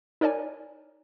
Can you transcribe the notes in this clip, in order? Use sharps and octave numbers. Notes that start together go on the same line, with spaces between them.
D#4 A#4 C#5 D5 G#5